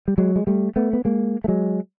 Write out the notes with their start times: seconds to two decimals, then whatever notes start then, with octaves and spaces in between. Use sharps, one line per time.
0.08 G3
0.18 F#3 G#3
0.36 G#3
0.47 G3 A3
0.76 A3 B3
0.93 B3
1.05 G#3 A#3
1.44 A3
1.48 F#3 G#3